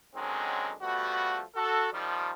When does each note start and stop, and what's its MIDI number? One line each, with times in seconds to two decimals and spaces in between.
0.16 0.72 50
0.16 0.72 51
0.16 0.72 54
0.16 0.72 56
0.16 0.72 60
0.16 0.72 61
0.82 1.41 53
0.82 1.41 55
0.82 1.41 57
0.82 1.41 59
0.82 1.41 66
1.55 1.88 66
1.55 1.88 69
1.92 2.31 51
1.92 2.31 53
1.92 2.31 55